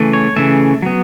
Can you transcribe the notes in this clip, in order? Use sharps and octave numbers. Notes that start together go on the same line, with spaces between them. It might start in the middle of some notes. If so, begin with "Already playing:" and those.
Already playing: C#3 E3 A3
C#5
C#3 E3 A3 E5
F#3 B3